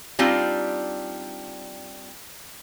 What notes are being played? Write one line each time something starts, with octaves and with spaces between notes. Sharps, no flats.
G3 C4 D4 D#4 F4